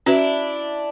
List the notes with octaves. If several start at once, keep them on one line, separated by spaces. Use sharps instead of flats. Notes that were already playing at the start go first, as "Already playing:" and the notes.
C#4 D4 E4 F#4 B4